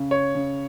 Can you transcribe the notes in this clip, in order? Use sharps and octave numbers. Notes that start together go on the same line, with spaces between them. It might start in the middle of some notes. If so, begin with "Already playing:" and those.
Already playing: C#3
C#5
C#3